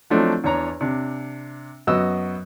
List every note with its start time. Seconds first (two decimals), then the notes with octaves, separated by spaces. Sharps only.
0.10 F3 F#3 A3 C4 D4 D#4
0.44 E2 D4 C#5 A#5
0.81 C3 D4
1.87 F#2 B3 F#4 D#5 E6